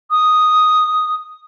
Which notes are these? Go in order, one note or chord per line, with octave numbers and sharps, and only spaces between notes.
D#6